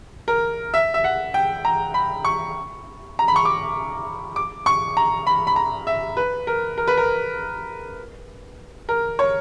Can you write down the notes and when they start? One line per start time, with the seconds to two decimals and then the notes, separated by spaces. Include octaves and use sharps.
0.28 A#4
0.74 E5
0.94 E5
1.04 F#5
1.34 G5
1.65 A#5
1.94 B5
2.25 C#6
3.19 A#5
3.28 B5
3.36 C#6
3.45 D6
4.36 D6
4.66 C#6
4.97 A#5
5.27 B5
5.47 B5
5.56 A#5
5.87 E5
6.17 B4
6.47 A#4
6.78 A#4
6.87 B4
6.97 A#4
8.89 A#4
9.19 C#5